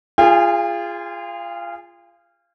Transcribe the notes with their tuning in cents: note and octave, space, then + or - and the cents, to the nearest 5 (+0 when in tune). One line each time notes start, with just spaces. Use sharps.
F4 -20 G#4 -15 G5 +45